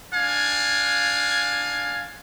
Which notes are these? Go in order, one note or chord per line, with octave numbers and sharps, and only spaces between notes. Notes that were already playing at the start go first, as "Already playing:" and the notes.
D4 F5 G#5